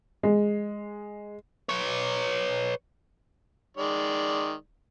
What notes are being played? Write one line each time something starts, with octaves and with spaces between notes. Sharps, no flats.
G#3
B4 C#5
D#3 G#3 D5